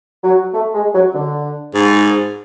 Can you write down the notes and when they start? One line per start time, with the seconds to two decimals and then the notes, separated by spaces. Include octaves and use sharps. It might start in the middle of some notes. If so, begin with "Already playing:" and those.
0.24 F#3
0.54 A3
0.74 G#3
0.94 F#3
1.14 D3
1.74 G#2